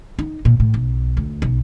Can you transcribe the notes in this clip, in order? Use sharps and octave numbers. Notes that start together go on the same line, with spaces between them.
D#4
A#2
A2
B1
D2
B1